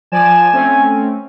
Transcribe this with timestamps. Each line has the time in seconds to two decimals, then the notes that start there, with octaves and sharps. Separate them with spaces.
0.12 F3 D5 G#5 E7
0.53 A3 C4 C#4